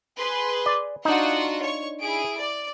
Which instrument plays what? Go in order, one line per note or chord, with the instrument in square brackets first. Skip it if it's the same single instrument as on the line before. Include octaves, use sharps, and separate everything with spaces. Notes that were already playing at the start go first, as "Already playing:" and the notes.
[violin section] G#4 B4 C6
[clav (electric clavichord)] D5
[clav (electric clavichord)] D4 D#4 [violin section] F4 F#4 F#5
[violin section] C#5 C#6
E4 G#4 D7
D5